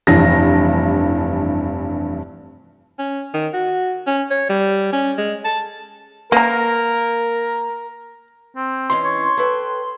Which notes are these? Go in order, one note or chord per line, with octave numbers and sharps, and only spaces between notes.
F1 G2 E3 A#6
C#4
D#3
F#4
C#4
C#5
G3
C#4
G#3
A5
A#3 A#4 B4 A#5
C4
G#2 E3 C#4 C6
C#5
A4 B4 G5